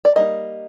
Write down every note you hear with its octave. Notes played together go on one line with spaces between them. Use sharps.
D5
G3 A#3 D#4 D#5